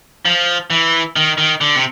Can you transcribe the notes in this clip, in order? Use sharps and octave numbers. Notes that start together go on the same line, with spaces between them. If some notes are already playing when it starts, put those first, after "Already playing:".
F3
E3
D#3
D#3
D3
C3